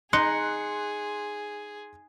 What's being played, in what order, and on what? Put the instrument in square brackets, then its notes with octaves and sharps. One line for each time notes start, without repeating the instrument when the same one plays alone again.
[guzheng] D#4 [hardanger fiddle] G#4 [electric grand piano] C6 F#6 C#7